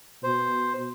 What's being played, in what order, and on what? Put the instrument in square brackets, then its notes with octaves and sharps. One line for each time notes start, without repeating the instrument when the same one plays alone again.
[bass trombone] B2 [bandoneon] C5